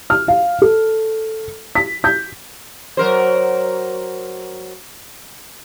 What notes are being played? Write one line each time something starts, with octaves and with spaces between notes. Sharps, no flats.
F6
F5
A4
B6
G6
F#3 A#4 C5